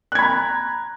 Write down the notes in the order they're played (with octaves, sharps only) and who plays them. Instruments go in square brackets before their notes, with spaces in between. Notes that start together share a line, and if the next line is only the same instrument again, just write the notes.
[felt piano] F#6
G#6
B5
A#5